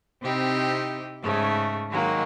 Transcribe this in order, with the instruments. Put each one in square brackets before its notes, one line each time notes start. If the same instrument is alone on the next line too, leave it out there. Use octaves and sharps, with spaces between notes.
[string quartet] C3 C4 D#4 E4 G4
G#2 C#3 A3
D#3 F#3 G#3 A#3